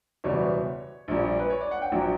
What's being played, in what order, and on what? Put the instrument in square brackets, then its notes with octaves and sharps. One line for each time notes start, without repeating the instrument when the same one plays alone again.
[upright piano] F#1 E2 B2 G3 C#5
A#1 A#2 G3
B4
C#5
D5
F#5
G5
A#1 A#2 F#3